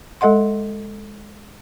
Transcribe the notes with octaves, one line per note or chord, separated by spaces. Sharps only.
G#3 A4 D#5 F#5 C6